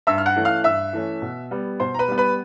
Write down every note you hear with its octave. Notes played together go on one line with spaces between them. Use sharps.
G2 E5 E6
F6
F#5 F#6
E3 A3 C#4
F5 F6
G2 E5 E6
E3 A3 C#4
B2
G3 B3
B2 C5 C6
A#5
B4 B5
G3 B3
B4 B5